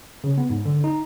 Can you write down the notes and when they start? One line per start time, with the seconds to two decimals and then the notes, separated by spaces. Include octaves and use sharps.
0.24 C#3
0.38 B3
0.50 G#2
0.65 D3
0.84 D#4